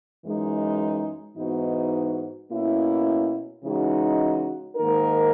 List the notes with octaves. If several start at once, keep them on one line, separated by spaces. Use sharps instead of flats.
F#2 E3 G#3 D#4
G#2 E3 B3 D#4 F#4
B2 A#3 C#4 E4
C#3 E3 G#3 D#4 F#4
G#2 D#3 A#3 D#4 A#4